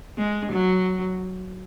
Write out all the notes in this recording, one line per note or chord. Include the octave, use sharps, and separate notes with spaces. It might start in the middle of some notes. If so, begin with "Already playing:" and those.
G#3
F#3